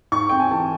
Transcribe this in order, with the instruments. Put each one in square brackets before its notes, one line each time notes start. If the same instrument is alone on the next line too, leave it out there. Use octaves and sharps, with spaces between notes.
[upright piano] G#2 C#6
C4 G5
G#5
E3 A5